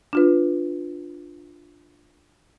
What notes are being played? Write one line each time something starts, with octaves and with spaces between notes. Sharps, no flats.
D4 F4 B4